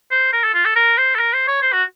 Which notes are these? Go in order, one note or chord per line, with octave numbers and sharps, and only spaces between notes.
C5
A#4
A4
F4
A4
A#4
C5
A4
A#4
C5
C#5
C5
F#4